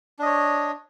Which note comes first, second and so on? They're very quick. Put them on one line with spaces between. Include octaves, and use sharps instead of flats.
D4 D#5 C#5